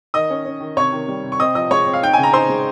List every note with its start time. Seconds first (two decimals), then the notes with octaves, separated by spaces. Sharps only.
0.14 D#3 D#5 D#6
0.30 C#4
0.45 C#4
0.61 D#3
0.77 C3 C#5 C#6
0.93 D#3
1.08 G3
1.23 C3
1.32 C#6
1.39 C4 D#5 D#6
1.55 F3 D#5 D#6
1.71 G#3 C#5 C#6
1.87 C4
1.93 F5
2.02 D#4 G5
2.13 C#3 G#5
2.23 A#5
2.33 D#4 C5 C6
2.49 G#3